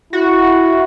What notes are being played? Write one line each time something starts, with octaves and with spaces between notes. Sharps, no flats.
E4 F#4